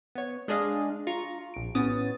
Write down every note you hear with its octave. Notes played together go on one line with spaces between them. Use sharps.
B3 C#5
G#3 D4 G#4 D#5 F5
F4 A#5 C#6
A#1 D7
A1 B3 C#4 D#6 A6